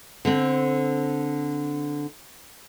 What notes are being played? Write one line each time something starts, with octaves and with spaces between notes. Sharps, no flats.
D3 C4